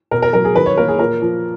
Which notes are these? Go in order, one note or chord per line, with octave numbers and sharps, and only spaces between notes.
B2 A#4
A#4
F#3 A#4
G#4
D#3 B4
C#5
A#3 A#4
G#4
A#2 A#4
F3